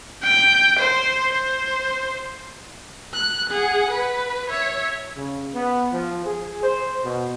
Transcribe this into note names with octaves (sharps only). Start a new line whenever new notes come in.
G5
C5
C5
F#6
G#4 F#5
B4
C#5 E5
C#3
B3
F3
G#4
C5
B2